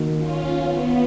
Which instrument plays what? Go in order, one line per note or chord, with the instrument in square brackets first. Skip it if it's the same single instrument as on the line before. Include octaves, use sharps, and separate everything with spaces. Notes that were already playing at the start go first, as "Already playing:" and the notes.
Already playing: [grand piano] D#3 A#3 D#4 F#4
[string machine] C#4 F4
B3